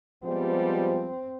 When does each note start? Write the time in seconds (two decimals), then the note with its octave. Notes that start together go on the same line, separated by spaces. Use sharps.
0.24 F3 G3 G#3 B3 C4